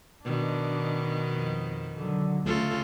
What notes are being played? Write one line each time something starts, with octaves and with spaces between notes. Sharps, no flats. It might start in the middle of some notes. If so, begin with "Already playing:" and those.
B2 D#3 D4
F2
D3 F#3
D2 C#3 A3 F4 A4